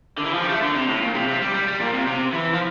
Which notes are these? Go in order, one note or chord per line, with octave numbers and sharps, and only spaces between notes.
D3
E3
F3
G3
A3
D3
C3
A2
A#2
C3
C3
G3
G3
G3
A#2
C3
C3
E3
F3